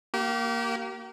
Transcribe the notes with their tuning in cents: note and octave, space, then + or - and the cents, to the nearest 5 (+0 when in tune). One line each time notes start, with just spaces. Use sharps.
A#3 +0 G4 -35